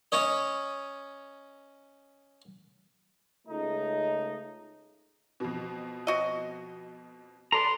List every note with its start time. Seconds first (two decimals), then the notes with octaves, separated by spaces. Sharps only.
0.12 C#4 C#5 D#5
3.47 C#2 C#3 A3 D#4
5.40 F2 B2
6.07 C4 F#4 D#5
7.52 A4 B4 D5 A5 A#5 C6